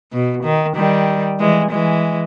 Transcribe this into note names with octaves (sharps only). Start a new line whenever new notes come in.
B2
D#3
D#3 G3
E3 G#3
E3 G#3